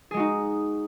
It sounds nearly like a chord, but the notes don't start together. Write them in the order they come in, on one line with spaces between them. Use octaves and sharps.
G#4 G#3 F#4 D#4